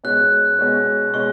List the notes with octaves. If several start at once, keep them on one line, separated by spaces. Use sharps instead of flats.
B2 G#3 C#4 F#6
B2 G#3 C#4
B2 G#3 C#4 C#6